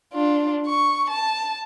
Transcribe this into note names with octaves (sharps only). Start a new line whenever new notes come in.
D4 F4
C#6
A5